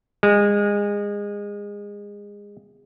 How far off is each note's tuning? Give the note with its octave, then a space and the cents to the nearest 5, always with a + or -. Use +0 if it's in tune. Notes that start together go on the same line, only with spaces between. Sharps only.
G#3 -25